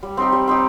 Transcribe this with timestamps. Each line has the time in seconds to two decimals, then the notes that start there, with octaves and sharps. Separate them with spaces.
0.03 G3
0.17 C4 D#4 G4
0.32 G3
0.47 C4 D#4 G4